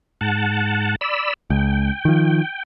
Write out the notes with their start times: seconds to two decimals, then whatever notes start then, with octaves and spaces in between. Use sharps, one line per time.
0.21 G#2 F#5 A5
1.01 D5 B5 E6
1.50 C#2 G5
2.05 D#3 F3